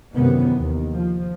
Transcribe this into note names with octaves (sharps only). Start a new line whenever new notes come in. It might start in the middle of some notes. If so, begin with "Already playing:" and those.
F#2 C3 D#3 E3 B3
D#2
F3